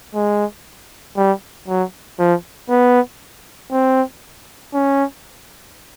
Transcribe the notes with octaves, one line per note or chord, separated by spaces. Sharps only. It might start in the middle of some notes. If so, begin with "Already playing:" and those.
G#3
G3
F#3
F3
B3
C4
C#4